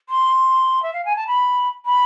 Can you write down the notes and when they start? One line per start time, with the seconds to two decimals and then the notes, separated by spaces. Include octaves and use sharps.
0.09 C6
0.83 E5
0.93 F5
1.05 G#5
1.16 A5
1.27 B5
1.85 B5